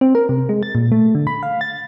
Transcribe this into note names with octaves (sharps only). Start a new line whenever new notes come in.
C4
A#4
C3
G#3
A6
A#2
A3
D3
B5
F5
A6